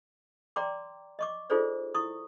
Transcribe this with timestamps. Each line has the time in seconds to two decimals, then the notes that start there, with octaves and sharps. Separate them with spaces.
0.56 D5 G5 A#5 C6 D6
1.19 D#5 C#6 D6
1.50 D#4 F4 G#4 A4 C5 D5
1.94 E4 C#6 D#6